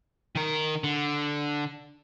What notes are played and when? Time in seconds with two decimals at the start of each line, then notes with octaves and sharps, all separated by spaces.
0.35 D#3 A#4
0.84 D3